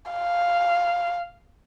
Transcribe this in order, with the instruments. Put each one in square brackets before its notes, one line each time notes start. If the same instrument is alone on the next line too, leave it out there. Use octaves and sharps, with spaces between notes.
[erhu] F5